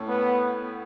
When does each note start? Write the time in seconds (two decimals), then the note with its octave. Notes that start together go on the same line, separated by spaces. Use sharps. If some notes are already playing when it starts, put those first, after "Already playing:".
Already playing: A2 A3 C#4 A4
0.08 B3